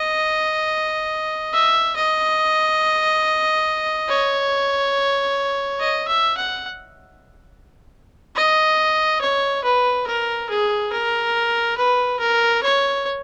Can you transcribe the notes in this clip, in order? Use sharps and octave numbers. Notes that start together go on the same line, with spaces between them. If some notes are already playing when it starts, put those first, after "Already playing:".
Already playing: D#5
E5
D#5
C#5
D#5
E5
F#5
D#5
C#5
B4
A#4
G#4
A#4
B4
A#4
C#5